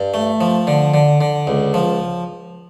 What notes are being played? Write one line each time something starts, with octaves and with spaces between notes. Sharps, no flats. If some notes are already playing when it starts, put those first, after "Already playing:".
Already playing: G2
A3
F3
D3
D3
D3
C#2
F3